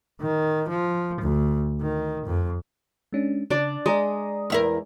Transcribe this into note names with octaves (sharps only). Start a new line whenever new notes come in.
D#3
F3
D2
D#3
F2
G#3 C#4 D4
C#3 D4 D5 D6
G#3 D5 A#5 D#6
E2 E4 A#4